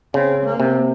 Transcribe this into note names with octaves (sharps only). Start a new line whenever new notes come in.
C#3 C4
A#3
C3